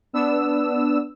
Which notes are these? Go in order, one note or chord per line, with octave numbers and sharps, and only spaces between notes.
B3 D4 E6